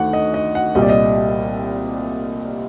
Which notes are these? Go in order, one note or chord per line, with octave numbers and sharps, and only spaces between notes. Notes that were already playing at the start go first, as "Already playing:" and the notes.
Already playing: D2 D#3 A3 F#5
D#5
D#5
F#5
C2 A#2 G3 D#5
D5
D#5